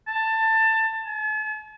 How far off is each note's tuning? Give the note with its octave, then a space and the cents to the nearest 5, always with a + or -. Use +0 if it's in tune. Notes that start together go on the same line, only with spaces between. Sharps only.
A5 +20
A5 -45